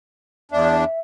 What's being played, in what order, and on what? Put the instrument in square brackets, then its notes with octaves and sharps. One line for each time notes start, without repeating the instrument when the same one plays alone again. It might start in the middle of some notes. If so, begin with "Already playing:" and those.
[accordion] E2 D4 [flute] E5